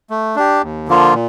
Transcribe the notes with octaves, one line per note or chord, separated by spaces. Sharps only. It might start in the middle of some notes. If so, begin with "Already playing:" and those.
A3
D4 G4
D#2
D3 F3 A#3 F4
A#2